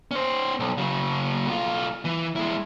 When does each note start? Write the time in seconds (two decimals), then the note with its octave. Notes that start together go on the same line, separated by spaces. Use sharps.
0.11 C#4 C5
0.60 B1
0.78 C#3 F#3
1.46 B1 F4
2.05 E3
2.36 G#3 E4